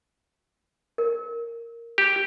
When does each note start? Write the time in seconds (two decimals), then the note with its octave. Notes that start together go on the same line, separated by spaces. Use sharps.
0.98 A#4
1.98 G4